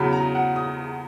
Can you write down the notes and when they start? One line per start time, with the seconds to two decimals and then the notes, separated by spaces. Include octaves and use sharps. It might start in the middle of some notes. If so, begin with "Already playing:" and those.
Already playing: E2 C#3 F#3 B5
0.13 A#5
0.35 F#5
0.56 D#6